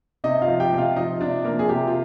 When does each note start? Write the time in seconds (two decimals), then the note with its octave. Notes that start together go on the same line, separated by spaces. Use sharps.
0.24 C3 D#4 D#5
0.42 F4 F5
0.48 F3
0.60 G4 G5
0.72 C3 G5
0.78 F4 F5
0.96 F3 D#4 D#5
1.21 C3 D4 D5
1.44 F3 A#3 A#4
1.59 G#4
1.69 C3 G4
1.88 F4